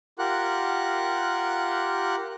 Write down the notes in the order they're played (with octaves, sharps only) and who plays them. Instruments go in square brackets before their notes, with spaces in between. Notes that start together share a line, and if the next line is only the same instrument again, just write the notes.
[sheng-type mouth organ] F4 G4 A#4 F#5 F#6